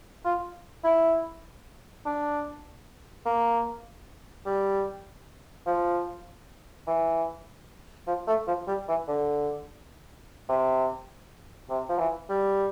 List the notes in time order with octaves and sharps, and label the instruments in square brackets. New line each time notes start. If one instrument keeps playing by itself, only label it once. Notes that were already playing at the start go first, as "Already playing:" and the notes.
[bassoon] F4
E4
D4
A#3
G3
F3
E3
F3
A3
F3
G3
E3
D3
C3
C3
F3
E3
G3